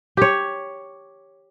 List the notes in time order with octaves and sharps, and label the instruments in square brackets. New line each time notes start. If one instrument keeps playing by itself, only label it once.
[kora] G4 C#5